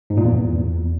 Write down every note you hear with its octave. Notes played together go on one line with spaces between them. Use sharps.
G#2
A#2
E2
F2
E2